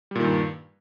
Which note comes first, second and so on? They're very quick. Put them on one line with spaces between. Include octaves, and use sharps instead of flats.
G3 A#2 D#3 G2